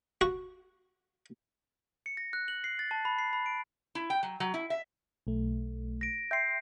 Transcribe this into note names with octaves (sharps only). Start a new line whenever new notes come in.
F#4
C#7
A#6
F#6
F#7
C7
A6
A5
B5
C7
B5
D7
E4
G5
F#3
F#3
E4
E5
B1 A3
A#6 D7
E5 G5 C6 G6 C7